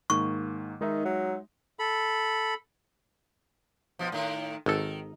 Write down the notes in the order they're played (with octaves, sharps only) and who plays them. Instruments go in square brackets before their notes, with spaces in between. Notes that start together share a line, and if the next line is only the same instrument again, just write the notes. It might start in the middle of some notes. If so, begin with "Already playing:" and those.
[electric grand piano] G#2 D#3 A#3 [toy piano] C#6
[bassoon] D#3 [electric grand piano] G#3 D#4 E5
[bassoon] F#3
[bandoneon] A4 B5
[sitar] B2 F3
A2 D#3
[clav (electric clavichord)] G#1 A4 [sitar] D#3